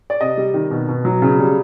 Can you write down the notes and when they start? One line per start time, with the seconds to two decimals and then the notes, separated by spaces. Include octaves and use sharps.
0.10 D5
0.21 C3 D#5
0.37 G3
0.54 D#3
0.71 B2
0.88 B2
1.05 F#3
1.22 C#3
1.39 G3